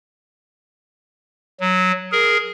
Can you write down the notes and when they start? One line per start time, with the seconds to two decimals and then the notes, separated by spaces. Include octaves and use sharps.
1.60 F#3
2.12 G#4 A#4